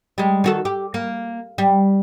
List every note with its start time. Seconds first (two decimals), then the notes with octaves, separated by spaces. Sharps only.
0.18 G3 G#3
0.44 D#3 F#4 A4
0.65 G4
0.94 A#3
1.58 G3